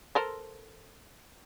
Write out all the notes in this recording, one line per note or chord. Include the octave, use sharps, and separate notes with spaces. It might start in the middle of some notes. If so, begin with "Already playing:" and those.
A4 A#4 C5